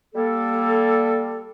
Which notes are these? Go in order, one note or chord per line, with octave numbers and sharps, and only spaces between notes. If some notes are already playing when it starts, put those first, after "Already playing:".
G3 A#3 A4